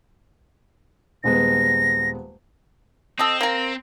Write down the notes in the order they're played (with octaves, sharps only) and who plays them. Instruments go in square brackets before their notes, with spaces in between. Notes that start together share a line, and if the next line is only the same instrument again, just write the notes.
[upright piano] D#1 G#3 B3 [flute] A#6
[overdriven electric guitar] C4 [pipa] A4 D#5
[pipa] A#3 A#4